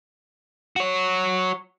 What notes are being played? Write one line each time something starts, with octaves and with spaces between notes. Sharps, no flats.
F#4 C#5